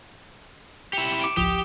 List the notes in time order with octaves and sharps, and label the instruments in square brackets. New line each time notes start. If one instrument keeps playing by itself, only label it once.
[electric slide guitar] E4 G4 [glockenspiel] C#7 E7
[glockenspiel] D6 D7
[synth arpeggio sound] G#1 C#2 F3 [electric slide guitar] G4 [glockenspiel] D#6